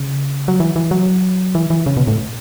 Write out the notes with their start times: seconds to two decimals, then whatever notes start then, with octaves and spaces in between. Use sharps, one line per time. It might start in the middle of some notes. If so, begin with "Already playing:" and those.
Already playing: C#3
0.48 F#3
0.60 E3
0.76 E3
0.91 F#3
1.55 E3
1.70 E3
1.86 C#3
1.97 B2
2.08 A2